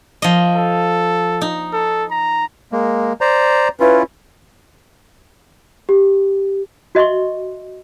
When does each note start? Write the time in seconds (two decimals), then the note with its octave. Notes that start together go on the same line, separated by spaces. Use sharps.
0.22 F3 D#5
0.56 A4
1.41 D#4
1.73 A4
2.11 A#5
2.72 G#3 A#3
3.21 C5 D5 A#5
3.80 C#4 E4 F4 B4
5.89 G4
6.95 F#4 D#5 E5 C6 C#6